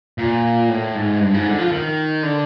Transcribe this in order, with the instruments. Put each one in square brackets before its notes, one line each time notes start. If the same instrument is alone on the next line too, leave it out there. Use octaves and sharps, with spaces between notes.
[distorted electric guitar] A#2
A2
G#2
G2
G#2
D3
F3
D#3
D3